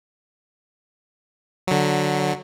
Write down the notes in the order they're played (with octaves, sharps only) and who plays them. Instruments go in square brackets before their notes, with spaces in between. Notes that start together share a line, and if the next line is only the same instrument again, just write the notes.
[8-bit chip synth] D3 F#3